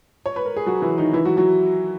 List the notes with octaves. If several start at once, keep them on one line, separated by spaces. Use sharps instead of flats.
C#5
B4
A#4
G#4
F#3 F#4
E3 E4
D#3 D#4
E3 E4
F#3 F#4
F#3 F#4